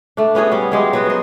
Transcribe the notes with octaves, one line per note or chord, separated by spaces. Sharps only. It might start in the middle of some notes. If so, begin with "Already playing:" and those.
A3 D4
B3 C#4 F#4 G#4
G3 C#4
F#3 G#3 G4
F#3 B3 F#4
C5 D#5